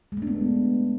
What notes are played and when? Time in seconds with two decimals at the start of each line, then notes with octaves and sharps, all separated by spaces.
0.12 G#3
0.17 A3
0.22 D4
0.27 B3